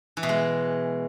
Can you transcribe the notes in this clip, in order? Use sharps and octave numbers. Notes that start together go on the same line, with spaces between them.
E3
B2
G#3